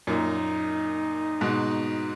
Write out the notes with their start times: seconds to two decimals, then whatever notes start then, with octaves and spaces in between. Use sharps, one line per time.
0.07 F#2 A#2 D#4
1.41 G#2 B2